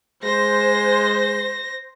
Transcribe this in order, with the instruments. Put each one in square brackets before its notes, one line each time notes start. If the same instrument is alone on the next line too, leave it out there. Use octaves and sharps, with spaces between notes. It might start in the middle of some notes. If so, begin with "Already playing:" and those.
[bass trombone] G#3 [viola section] C5 [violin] A#6